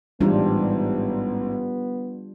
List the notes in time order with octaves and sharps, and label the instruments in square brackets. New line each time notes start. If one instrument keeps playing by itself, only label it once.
[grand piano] A1 G#2 [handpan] G3 D4 F4 [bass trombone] B3